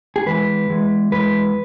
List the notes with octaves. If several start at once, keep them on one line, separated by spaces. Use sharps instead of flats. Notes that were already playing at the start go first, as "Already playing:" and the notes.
G#4
E2 E3 G#3 B4
E2 E3 G#3
E2 E3 G#3 B4